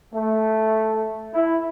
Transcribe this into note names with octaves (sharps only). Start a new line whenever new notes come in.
A3
E4